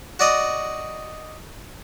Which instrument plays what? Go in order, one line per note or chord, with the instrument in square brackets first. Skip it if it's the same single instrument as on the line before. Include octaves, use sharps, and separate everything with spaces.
[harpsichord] F#4 D5 D#5